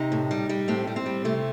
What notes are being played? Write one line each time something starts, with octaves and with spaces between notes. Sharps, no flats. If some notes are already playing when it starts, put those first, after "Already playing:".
Already playing: C3 D#4
A2
G3
G3
A2 C4
G3
C4
G3
C3 A3